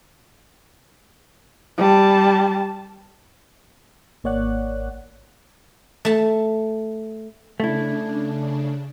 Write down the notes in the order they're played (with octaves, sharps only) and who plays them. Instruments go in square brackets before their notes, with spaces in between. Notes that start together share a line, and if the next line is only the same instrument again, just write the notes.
[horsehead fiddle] G3 A5
[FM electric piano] G#1 A#3 C#5 D5 F#5 F#6
[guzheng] A3 A5
[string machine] C#3 D4 [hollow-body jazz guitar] A3 E4